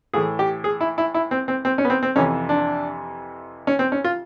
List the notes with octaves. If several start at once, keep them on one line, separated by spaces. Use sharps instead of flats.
A2 E3 G#4
G4
G#4
E4
E4
E4
C4
C4
C4
C#4
B3
C4
C4
F2 C3 E3 C#4
D4
C#4
C4
C#4
F4